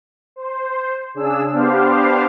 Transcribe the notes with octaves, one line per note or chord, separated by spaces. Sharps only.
C5
C#3 D4 G#4 E6
B3 D4 G4 C5 F5